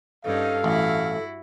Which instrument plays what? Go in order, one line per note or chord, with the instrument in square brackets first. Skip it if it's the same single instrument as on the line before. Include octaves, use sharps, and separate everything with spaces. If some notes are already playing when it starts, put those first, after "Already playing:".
[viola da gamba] G2 C#4 D#4 [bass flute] A4 [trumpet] F5
[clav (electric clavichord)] A1 [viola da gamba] E4 F#4